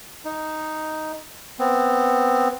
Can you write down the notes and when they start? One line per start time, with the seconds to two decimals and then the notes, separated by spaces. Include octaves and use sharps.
0.25 D#4
1.59 B3 C4